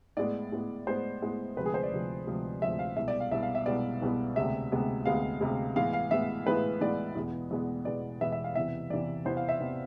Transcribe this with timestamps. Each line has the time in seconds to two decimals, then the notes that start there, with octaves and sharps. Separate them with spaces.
0.17 A2 G#3 B3 D5
0.52 A2 G#3 B3
0.87 A2 G#3 B3 C5
1.22 A2 G#3 B3
1.57 D2 C3 F3 G#3 B4
1.66 G#4
1.74 C5
1.83 D5
1.91 D2 C3 F3 G#3
2.27 D2 C3 F3 G#3
2.62 D2 C3 F3 G#3 E5
2.79 F5
2.96 C2 B2 G#3 B3 E5
3.08 D5
3.20 F5
3.31 C2 B2 G#3 B3 E5
3.43 F5
3.55 E5
3.66 C2 B2 G#3 B3 D5
4.02 C2 B2 G#3 B3
4.36 D2 C3 G#3 B3 E5
4.72 D2 C3 G#3 B3
5.06 D2 C3 G#3 B3 F5
5.40 D2 C3 G#3 B3
5.76 A2 E3 G#3 B3 F5
5.93 F5
6.11 A2 E3 G#3 B3 E5
6.46 A2 E3 G#3 B3 B4
6.81 A2 E3 G#3 B3 D5
7.16 E2 B2 G#3 B3
7.51 E2 B2 G#3 B3
7.85 E2 B2 G#3 B3 D5
8.21 E2 B2 G#3 B3 E5
8.32 E5
8.44 F5
8.55 E2 C3 E3 B3 E5
8.90 E2 C3 E3 B3 D5
9.25 E2 C3 E3 B3 C5
9.37 F5
9.49 E5
9.60 C3 E3 B3